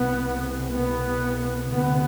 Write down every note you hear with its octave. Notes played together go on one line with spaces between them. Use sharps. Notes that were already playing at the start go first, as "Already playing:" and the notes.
Already playing: C2 C3 B3
B3
D2 C3 B3